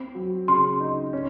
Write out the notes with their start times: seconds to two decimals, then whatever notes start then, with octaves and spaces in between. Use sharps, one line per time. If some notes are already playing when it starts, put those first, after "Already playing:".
Already playing: C4
0.15 F#3
0.48 C#3 C6
0.80 D#4
1.13 C#4